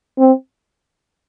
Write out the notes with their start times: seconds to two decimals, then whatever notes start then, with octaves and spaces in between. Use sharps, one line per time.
0.18 C4